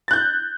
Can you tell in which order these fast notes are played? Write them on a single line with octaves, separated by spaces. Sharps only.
A6 F#6 G6